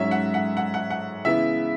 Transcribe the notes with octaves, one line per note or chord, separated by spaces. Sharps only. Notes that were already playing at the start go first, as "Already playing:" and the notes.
Already playing: G#2 F#3 C#4 E5
F#5
F#5
F#5
F#5
F#5
C#3 E3 B3 E5